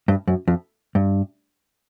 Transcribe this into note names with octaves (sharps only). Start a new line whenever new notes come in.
G2
F#2
F2
G2